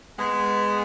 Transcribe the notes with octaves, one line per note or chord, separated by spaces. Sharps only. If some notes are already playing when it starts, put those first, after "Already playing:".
G#3 B3